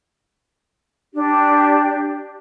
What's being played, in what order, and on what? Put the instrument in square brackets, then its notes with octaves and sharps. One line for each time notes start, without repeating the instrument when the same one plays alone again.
[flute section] D4 G4